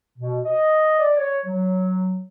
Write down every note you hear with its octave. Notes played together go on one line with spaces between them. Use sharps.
B2
D#5
D5
C#5
F#3